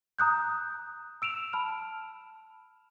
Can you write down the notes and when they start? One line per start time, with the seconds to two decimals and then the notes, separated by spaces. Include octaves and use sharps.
0.19 A#5 D#6 F#6 G6
1.22 E6 D7 E7 F7
1.53 A5 B5 F6